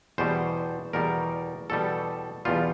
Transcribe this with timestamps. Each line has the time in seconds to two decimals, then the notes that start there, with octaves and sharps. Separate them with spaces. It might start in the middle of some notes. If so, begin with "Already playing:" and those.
0.18 E2 B2 G3 C5
0.93 E2 B2 G3 A#4
1.70 E2 B2 G3 A4
2.45 E2 B2 G3 F4